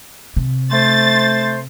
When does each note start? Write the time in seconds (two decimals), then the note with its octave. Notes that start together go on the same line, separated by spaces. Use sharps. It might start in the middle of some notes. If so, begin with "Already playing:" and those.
0.36 C3
0.71 A3 C5 A6